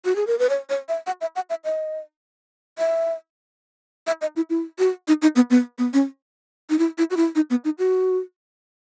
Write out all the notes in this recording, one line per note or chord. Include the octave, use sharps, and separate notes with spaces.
F#4
G#4
A#4
B4
C#5
C#5
E5
F#5
E5
F#5
E5
D#5
E5
E5
D#5
E4
E4
F#4
D#4
D#4
B3
B3
B3
C#4
D#4
E4
E4
F#4
E4
D#4
B3
D#4
F#4